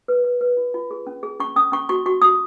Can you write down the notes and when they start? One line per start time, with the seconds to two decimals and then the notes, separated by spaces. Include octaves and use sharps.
0.08 B4
0.24 B4
0.41 B4
0.57 F4
0.74 F4
0.91 G#4
1.07 C#4
1.23 G#4
1.40 C#4 C#6
1.56 C#4 D#6
1.72 C#4 C#6
1.89 F#4 C#6
2.06 F#4 C#6
2.22 F#4 D#6